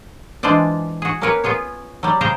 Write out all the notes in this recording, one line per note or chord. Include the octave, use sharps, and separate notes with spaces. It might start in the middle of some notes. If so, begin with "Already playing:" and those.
E3 G#3 D4 F4 C5 D5
F#4 G#4
A#3 C#4 F#4 A#4 B4 C#5
B3 F4 G#4 C#5
F#3 G3
C#3 G#4 C5 F5 G5 A#5